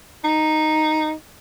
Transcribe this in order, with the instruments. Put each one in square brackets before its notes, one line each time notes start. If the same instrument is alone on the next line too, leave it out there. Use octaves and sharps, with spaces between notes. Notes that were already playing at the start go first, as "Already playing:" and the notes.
[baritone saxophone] D#4